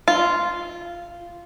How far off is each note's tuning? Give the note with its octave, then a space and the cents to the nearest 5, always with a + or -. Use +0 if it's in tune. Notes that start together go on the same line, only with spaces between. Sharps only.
F4 -10